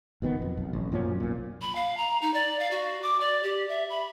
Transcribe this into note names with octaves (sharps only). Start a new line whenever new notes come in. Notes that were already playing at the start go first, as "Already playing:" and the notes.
F#1 B2 D#3 B3
F2
B1
A1
F#2 A#2 F3 C#4
B1 A#2
B5
F5
A#5
D#4
D5
F5
F#4
D6
D5
G4
E5
B5